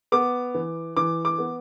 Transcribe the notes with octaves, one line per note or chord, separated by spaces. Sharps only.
B3 D6
E3
E3 D6
D6
B3